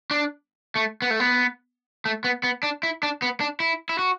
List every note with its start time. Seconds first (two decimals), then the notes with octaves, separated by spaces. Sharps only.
0.11 D4
0.76 A3
1.02 B3
1.11 A3
1.20 B3
2.05 A3
2.24 B3
2.43 B3
2.63 D4
2.83 E4
3.03 D4
3.22 B3
3.40 D4
3.60 E4
3.89 E4
3.99 F#4